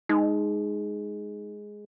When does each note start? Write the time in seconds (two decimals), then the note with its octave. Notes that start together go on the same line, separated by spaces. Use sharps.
0.09 G#3 D#4